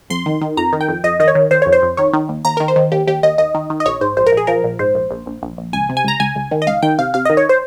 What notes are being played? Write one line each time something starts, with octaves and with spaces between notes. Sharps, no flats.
F2 C6
D#3
D#3
F2 A#5
D#3
G5
F2
F2 D#5
D#3 D#5
C#5
D#3
D#3 C5
F2 C#5
C5
F2
D#3 C#5
D#3
D#2
D#2 A#5
D#3 A#4
C5
D#3
D#2 G4
D#2 G4
D#2 D#5
D#2 D#5
D#3
D#3
D#5
A#1 C#5
G#2 C5
A#1 C5
A#4
A#1
G#4
F3 A#4
A#1
G#2 C5
A#1
A#1
A#1
A#1
A#1
C#2 G#5
C3
G#5
C#2 A#5
C#2 G#5
C#2
D#3
D#5
C#2 F5
D#3 G5
C3 F5
C3 F5
D#5
D#3
C#5
C5